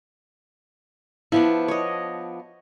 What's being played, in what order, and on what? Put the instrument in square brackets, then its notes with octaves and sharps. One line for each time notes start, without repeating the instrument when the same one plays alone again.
[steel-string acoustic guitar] F3 B3 D4 [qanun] E4
[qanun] C#5 D#5